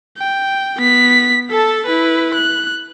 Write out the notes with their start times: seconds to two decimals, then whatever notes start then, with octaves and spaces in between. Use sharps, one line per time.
0.18 G5
0.77 B3 B6
1.50 A4 A5
1.86 E4 B4
2.34 F#6